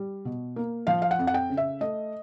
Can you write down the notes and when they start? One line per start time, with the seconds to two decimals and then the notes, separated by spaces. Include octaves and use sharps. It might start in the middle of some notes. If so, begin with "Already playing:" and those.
Already playing: G3
0.25 B2
0.56 A#3
0.87 F3 F5
1.02 F5
1.11 F#5
1.19 F2
1.27 F#5
1.34 G5
1.49 C#3
1.57 E5
1.81 A3 D#5